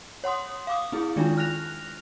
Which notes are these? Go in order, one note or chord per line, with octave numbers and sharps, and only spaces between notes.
C#5 F#5 C6 D#6
F5 D6 D#6
C4 E4 G#4
D#3 G#3 D4 D#4 F4
F6 F#6 A#6 F7